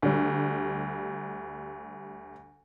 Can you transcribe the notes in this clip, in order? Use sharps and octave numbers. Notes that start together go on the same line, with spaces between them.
D2 G3